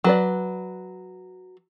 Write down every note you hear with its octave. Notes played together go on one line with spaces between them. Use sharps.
F#3 B4 D5